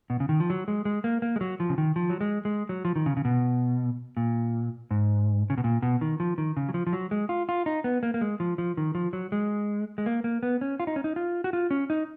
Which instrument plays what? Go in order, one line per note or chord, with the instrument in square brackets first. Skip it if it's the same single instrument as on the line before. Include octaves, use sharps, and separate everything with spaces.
[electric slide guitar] B2
C#3
D#3
F3
F#3
G#3
G#3
A#3
A#3
G#3
F#3
F3
C#3
D#3
F3
F#3
G#3
G#3
F#3
F3
D#3
C#3
C#3
B2
A#2
G#2
C#3
B2
A#2
B2
D#3
F3
D#3
C#3
F#3
F3
F3
F#3
G#3
F4
F4
D#4
B3
A#3
A#3
G#3
F3
F3
D#3
F3
F#3
G#3
G#3
A#3
A#3
B3
C#4
F4
D#4
C#4
D#4
F4
F#4
F4
C#4
D#4